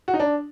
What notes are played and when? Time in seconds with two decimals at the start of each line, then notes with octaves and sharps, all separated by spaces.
0.08 F#4
0.14 D#4
0.20 D4